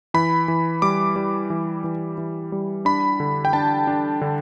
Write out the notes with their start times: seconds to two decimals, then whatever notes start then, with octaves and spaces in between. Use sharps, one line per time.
0.14 E3 B5
0.48 E3
0.82 G3 D6
1.16 G3
1.50 E3
1.84 E3
2.18 E3
2.52 G3
2.85 D4 B5
3.20 D3
3.45 G5
3.53 D4 A5
3.87 D4
4.21 D3